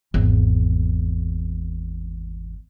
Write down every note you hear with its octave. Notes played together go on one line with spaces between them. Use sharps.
G#1 E2